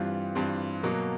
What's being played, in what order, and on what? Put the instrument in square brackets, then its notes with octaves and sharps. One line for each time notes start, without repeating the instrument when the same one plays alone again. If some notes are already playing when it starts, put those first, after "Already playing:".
Already playing: [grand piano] G2 E3 G3 C4 F4
G2 E3 G3 C4 F4
B2 F#3 A#3